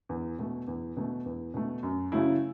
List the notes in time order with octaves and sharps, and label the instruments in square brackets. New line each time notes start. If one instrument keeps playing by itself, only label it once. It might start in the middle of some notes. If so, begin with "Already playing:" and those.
[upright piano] E2
B2 A3
E2
B2 A3
E2
B2 A3
F#2
C#3 F#3 A3 E4